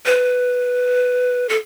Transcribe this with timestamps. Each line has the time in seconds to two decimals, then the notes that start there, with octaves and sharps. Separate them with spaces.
0.06 B4
1.49 A4